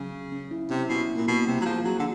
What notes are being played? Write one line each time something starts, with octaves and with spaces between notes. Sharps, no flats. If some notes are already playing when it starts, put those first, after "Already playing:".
Already playing: C#3 F#3
C#4
C#4
E4
C3 C#4
B2 E4
A#3
A#2
B2 A#3
C3 G3
F#3
F3 G#4
F#3 G#4
D3